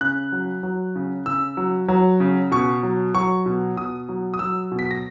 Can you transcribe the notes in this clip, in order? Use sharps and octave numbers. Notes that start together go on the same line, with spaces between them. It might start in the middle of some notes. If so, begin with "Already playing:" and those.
C#3 F#6
F#3
F#3
C#3
C#3 E6
F#3
F#3
C#3
B2 C#6
F#3
F#3 C#6
B2
B2 D#6
F#3
D#6
F#3 E6
B2
B6
A#6